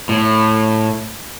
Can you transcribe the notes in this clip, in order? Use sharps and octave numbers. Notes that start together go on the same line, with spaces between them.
A2